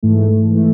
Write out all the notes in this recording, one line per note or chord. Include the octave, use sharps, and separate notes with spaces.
G#2 E3 A3
E3 A3